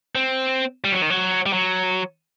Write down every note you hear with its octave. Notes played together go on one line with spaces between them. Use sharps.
C4
G3
F#3
D#3
F#3
G3
F#3